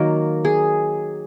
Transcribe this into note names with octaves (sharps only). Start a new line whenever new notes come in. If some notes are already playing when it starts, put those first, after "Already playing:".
Already playing: D#3 F#3 A#3 A#4
G#4